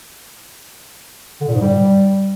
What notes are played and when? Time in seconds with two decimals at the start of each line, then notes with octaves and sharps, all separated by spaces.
1.41 D3
1.48 A#2
1.54 G#2
1.61 G3